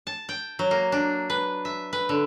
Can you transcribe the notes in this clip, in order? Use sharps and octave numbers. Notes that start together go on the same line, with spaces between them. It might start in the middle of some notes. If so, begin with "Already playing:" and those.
A5
G5
F#3
A#3
D4
B4
E5
B4
D3